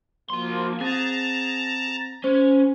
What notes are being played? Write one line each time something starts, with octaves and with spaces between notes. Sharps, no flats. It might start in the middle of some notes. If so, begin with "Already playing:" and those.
F3 A#3 F#4 C6
C4 G#4 A5 A#5 A6
C#4 C5